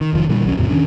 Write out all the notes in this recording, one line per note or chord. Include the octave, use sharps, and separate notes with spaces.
D#3
F1 D#3 F3
A#2 D3 E3 G3
D#1 B1 F#3 C#4
E2 A2 C3 F#3
D#3 C#4 D4